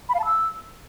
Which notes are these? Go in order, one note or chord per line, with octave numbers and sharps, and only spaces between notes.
B5
F5
A5
E6